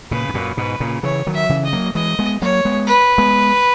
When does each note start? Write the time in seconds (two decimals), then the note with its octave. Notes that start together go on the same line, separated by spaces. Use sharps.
0.11 A#2 C#3 B4
0.29 G#2
0.34 F#2 A#2
0.57 G#2 B2 B4
0.80 A#2 C#3
1.03 C#3 E3 C#5
1.27 D#3 F#3
1.34 E5
1.49 C#3 E3
1.66 D#5
1.73 F#3 A#3
1.95 E3 G#3 D#5
2.19 G#3 B3
2.42 F#3 A#3 C#5
2.65 G#3 B3
2.87 B4
3.18 G#3 B3